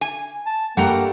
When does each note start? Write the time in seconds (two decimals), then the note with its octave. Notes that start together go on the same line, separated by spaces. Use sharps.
0.01 G#5
0.46 A5
0.77 G2 G3 A3 A#3 F#5 G5 A#5